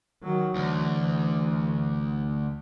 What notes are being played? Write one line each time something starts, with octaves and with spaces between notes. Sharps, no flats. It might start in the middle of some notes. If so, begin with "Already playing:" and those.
D#3 F#3
D2 E3